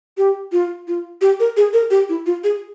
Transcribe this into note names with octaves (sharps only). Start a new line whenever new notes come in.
G4
F4
F4
G4
A#4
G#4
A#4
G4
E4
F4
G#4